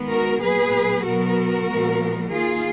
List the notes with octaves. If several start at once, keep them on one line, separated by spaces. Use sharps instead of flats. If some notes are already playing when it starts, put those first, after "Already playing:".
Already playing: D#3 G#3 B3
F#4 A#4
A#2 F#3 B3 G#4 B4
B2 F#3 B3 F#4 A#4
A#2 F3 G#3 B3
D#3 A#3 F4 G#4